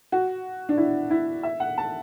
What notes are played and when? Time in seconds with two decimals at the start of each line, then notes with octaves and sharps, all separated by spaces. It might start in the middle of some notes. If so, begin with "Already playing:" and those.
0.12 F#4
0.69 D4
0.77 E4
1.10 E4
1.43 E5
1.60 F#5
1.78 A5